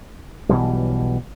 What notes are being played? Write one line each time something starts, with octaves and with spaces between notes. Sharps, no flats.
B1 B2 E3 G3